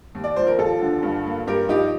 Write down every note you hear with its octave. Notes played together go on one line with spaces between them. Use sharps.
D#2
D5
F3 C5
A#4
D#2 F4 A4
D3
G2
A#3
G2 G4 A#4
F3 D#4 G4